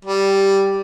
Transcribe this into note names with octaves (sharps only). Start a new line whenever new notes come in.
G3